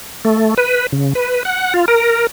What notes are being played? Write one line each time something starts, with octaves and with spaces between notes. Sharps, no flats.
A3
B4
C#3
B4
F#5
F4
A#4